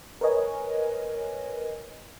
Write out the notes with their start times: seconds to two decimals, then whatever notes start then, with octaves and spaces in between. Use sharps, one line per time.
0.21 A#4 B4 C#5 D#5 G#5